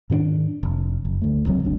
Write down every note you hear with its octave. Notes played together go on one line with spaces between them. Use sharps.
G#2 D#3 C4 D4
F1
F#1
D2 A3
D#1 C#2 F#3 C4
G1 D2 D4